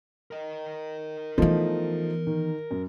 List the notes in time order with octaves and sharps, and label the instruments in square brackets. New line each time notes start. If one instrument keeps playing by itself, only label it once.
[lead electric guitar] A#4 D#5
[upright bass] E3 B3 [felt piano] F3 A3 D#4
[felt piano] D#3
F#2